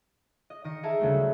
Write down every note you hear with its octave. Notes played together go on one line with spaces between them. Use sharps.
D#5
D#3 D#5 C#7
G#4 A#4 E5 G#5 A5
D2 C#3 G3 A3
F#3